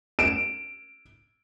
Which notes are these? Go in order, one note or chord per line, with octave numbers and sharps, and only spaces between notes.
D7 E7